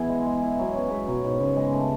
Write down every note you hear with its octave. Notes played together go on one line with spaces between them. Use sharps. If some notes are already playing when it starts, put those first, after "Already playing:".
Already playing: E3 B3 E4 G#4
G#3
G#3
E4
F#3
B3 C#4
G#3 B4
B2 F#3
G#2 B2
C#3 B3
G#3
A3